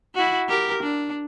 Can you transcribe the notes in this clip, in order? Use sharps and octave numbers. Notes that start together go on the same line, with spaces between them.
E4 F#4
G4 A#4
D4